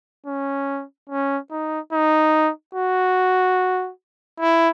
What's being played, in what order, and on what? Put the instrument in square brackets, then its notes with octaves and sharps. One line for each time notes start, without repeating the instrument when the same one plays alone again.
[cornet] C#4
C#4
D#4
D#4
F#4
E4